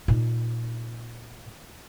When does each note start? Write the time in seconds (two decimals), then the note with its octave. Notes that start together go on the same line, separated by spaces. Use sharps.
0.08 A#2 D#4